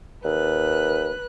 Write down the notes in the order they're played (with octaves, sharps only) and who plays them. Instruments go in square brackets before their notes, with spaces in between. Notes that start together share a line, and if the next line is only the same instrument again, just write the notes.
[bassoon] D#2 [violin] B4 F#6